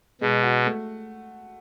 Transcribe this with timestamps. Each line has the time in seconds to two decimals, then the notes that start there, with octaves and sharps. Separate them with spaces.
0.21 B2 G#3
0.43 F#4
0.66 A3